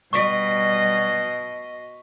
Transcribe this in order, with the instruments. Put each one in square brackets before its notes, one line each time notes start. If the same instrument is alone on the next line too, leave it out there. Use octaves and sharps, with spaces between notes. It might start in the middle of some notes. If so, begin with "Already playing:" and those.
[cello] B2 D#5 [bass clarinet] G3 [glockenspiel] C#6 B6